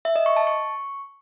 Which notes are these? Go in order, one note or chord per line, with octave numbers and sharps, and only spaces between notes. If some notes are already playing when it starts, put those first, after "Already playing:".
E5
D#5
C#6
A5
C#6